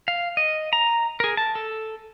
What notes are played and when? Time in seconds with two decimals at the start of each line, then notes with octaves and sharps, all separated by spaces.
0.08 F5
0.37 D#5
0.73 A#5
1.20 G#4 A#4
1.37 A5
1.55 A4